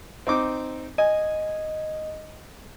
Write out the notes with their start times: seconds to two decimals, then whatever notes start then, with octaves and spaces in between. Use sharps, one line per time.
0.27 C4 D#4 D6
0.98 D#5 G#5